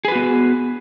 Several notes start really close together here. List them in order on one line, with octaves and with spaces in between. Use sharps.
G#4 B4 F#4 B3